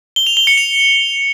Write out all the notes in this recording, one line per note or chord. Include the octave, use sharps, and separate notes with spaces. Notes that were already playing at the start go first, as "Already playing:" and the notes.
G7
F7
G7
C#7
F7